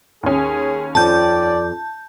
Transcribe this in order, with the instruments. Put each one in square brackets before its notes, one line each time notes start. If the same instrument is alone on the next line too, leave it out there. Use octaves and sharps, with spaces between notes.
[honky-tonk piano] D#2 C#4 [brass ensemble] G#4
[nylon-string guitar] F2 C4 [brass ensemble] D5 [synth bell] A5 G6